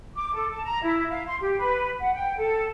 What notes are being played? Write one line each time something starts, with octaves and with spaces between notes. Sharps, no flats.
D6
A4
A5
A#5
E4
F5
C6
G4
B4
F#5
G5
A4